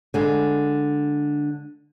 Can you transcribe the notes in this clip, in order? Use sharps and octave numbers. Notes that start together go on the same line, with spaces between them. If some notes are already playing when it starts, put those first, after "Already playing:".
D3 G#3